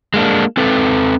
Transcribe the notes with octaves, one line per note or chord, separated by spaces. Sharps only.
G#3 A#3 D4
C4 A4 B4